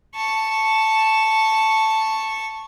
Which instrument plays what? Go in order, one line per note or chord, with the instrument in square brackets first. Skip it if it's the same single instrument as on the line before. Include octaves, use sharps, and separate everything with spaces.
[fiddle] A5 C#6